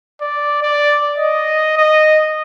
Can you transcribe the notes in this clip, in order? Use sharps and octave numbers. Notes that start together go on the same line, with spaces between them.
D5
D5
D#5
D#5